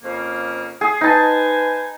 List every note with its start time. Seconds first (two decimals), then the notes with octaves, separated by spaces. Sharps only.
0.03 F2 C#3 A#3
0.81 G#4 D#6
1.01 D#4 B4 C5 G#5 A5